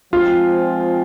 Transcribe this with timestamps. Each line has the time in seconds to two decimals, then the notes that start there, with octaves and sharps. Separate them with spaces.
0.12 F3 G#3 C4 F4